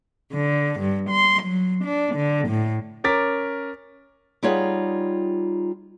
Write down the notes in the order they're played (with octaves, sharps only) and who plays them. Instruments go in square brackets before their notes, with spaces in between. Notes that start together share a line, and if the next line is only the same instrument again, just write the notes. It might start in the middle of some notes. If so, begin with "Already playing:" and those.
[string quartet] D3
G2
C6
F#3
D4
D3
A2
[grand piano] C#4 A#4 D6 A6 B6
[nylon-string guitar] G3 D#4 F4 G#4 C#5 F#5